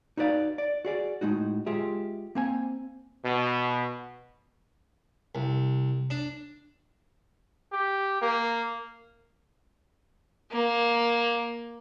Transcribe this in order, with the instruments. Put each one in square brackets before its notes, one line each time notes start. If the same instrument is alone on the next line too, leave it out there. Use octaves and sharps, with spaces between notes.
[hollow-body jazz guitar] D#4 F#4 B4 D5 F5
D5
F#4 G#4 D5
A2 G#3 D#4 F#4
G#3 F4 G4 G#4 E5
A#3 C4 G#5
[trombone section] B2
[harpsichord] C2
D4
[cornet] G4
A#3
[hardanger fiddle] A#3